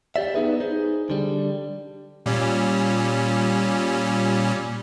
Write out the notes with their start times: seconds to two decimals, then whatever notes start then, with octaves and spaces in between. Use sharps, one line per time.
0.16 G4 D5 E5
0.34 B3 D#4 G#4 B4
0.60 D#4 G#4 C5
1.10 D3 G3
2.26 A#2 G3 C#4